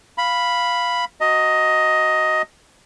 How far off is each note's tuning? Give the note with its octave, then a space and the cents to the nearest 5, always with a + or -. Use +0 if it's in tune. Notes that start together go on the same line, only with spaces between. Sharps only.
F5 +0 B5 +0
F#4 +0 D#5 +10 A#5 -35